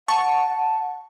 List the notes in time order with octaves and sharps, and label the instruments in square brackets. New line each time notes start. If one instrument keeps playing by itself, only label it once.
[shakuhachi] F#5 [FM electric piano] A5 [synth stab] C#6